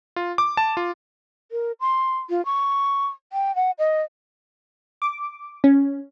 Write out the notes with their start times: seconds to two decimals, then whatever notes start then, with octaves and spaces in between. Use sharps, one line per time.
0.16 F4
0.38 D6
0.57 A5
0.77 F4
1.52 A#4
1.80 C6
2.30 F4
2.45 C#6
3.33 G5
3.56 F#5
3.79 D#5
5.02 D6
5.64 C#4